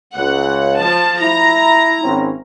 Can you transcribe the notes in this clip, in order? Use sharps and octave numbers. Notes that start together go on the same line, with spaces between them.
C#2 F#5
F3 A5
E4 A#5
G#1 C4 C#4